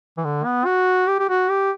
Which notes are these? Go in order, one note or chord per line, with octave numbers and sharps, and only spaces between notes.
E3
D3
B3
F#4
G4
G4
F#4
G4